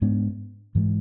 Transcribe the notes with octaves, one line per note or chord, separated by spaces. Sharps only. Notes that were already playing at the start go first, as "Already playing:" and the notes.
G#2 G#3 B3 D4
G#2 E3 G#3